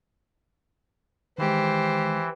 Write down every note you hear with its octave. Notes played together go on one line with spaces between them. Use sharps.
D#3 E3 G#3 G4 C5